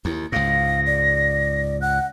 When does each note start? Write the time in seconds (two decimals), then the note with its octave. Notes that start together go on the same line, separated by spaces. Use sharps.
0.05 D#2 E4
0.32 C#2 G#2 F5 A#6
0.86 D5
1.81 F#5 F#6